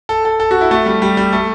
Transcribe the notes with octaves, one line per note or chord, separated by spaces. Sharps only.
A4
A4
A4
F#4
E4
A3
G3
G3
G3
A3